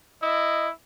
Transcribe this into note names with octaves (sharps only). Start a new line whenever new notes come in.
E4 D#5